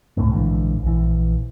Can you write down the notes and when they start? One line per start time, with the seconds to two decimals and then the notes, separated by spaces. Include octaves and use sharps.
0.17 C#2 A2 C3 A3
0.31 A#1 G#2 D3 E3
0.83 A#1 E3